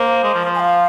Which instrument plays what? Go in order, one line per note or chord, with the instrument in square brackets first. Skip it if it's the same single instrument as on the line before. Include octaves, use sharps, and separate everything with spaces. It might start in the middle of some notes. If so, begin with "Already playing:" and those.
Already playing: [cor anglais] A#3 [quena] C5
[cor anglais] G#3
F3
F3
[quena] G#5
F5